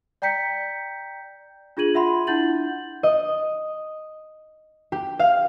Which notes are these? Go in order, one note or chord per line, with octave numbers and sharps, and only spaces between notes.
D5 G5 A#5 G6 B6 C#7
D4 F4 G#4 G#6 D#7 F#7
F4 E5 F#5 B5 C6
D4 E4 F#5 G6 A6 F#7
D#5
G4
F5